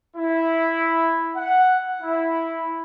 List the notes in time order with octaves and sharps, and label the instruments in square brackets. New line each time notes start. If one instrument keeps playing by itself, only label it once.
[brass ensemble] E4
F#5
E4